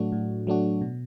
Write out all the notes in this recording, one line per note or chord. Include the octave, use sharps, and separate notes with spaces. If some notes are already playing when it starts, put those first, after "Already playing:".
Already playing: A2 F#3 A3 D4 F#4
A2
F#3 A3 D4 F#4
B2